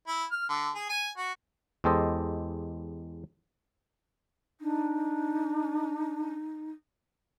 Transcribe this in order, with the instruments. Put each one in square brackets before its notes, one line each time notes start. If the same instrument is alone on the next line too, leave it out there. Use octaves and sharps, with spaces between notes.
[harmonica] E4
F6
D3
G#4
G#5
F#4
[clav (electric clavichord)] E2 G#3 G4 A4 C5 D#5
[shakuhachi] D4 [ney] D#4